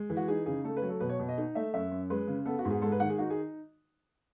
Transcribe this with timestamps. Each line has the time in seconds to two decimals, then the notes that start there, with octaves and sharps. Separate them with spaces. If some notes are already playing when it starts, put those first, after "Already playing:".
Already playing: G#3
0.10 E3
0.17 F#4
0.28 D#4 G#4
0.46 C#3 G#4
0.64 A3 A4
0.77 B4
0.82 F#3
0.89 A4
1.00 B2 B4
1.09 C#5
1.19 B2
1.29 D#5
1.38 D#4
1.55 A3 E5
1.74 F#2 E5
1.91 F#2
2.10 G#3 B4
2.27 C#3
2.46 B3 A4
2.59 F#4
2.65 G#2
2.70 G#4
2.82 G#3 A4
2.92 B4
3.00 D#3 F#5
3.10 G#4
3.18 D#4 F#4
3.30 G#4